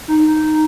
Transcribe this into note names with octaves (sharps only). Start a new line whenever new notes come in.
D#4